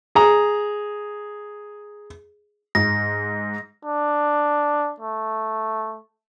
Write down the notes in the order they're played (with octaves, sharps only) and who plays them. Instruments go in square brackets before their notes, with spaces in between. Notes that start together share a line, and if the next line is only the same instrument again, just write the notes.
[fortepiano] G#4 A#5
[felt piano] G#2 [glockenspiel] A#6
[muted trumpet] D4
A3